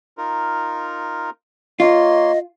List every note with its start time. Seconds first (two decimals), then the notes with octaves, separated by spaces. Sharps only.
0.18 D#4 F4 A#4
1.80 A#3 F4 C#5 D#5 C6